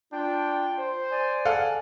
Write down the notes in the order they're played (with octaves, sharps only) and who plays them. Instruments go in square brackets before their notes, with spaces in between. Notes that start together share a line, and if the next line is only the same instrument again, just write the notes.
[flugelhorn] D4 [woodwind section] F4 G5
[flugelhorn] C5
[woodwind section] D5 G#5
[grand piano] A4 F5 F#5